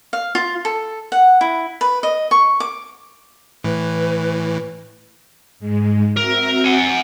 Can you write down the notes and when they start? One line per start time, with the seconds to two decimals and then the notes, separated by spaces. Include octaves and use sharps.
0.13 F5
0.35 F4
0.65 A4
1.12 F#5
1.41 E4
1.81 B4
2.03 D#5
2.31 C#6
2.60 D6
3.64 A2 E3 B4
5.60 G#2 G#3
6.17 C4 F#4 A#4 E5
6.64 F#5 G#5